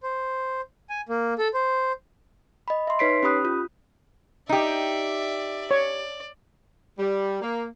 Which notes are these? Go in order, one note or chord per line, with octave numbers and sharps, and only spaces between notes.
C5
G#5
A#3
A4
C5
D#5 B5
E5 C6
D#4 B4 C#5 B6 C7 D7
C#4 G4 B5 D#6 F#6
F4
D#4 G4 D5 E5
C#5 D5
G3
A#3